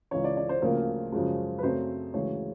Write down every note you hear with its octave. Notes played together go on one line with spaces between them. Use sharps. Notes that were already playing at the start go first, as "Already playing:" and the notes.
C#2 C#3 E3 C#5
D5
D5
C5
D2 C#3 F3 A#3 A#4
F#2 C#3 F3 G#3
B4
F#2 C#3 F#3 A3 C4 C5
D2 C#3 E3 G#3 C#5